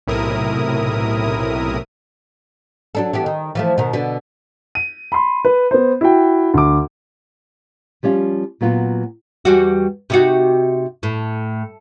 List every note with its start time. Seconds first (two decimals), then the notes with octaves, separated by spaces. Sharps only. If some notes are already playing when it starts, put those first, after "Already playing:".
0.07 B1 A2 C3 E4 A#4 D#6
2.95 F#3 D4 A4
3.13 E3 B3 G4
3.26 D#3
3.55 E3 F3 A3
3.78 B2 D#3
3.93 B2 D3 B3
4.75 D#7
5.12 B5 C6
5.45 B4
5.71 B3 C5
6.01 E4 F#4 G5
6.54 D2 D6
8.03 F3 G3 C#4 F4
8.61 A#2 F#3 B3 F4
9.45 E2 G3 F#4
10.10 C3 D#4 F#4
11.03 A2